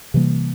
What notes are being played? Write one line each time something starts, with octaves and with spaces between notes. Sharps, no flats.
C3 E3 G3 A#3